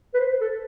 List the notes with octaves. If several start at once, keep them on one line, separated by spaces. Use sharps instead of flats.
B4
C5
A4